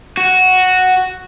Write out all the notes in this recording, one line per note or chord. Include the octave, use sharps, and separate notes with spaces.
F#4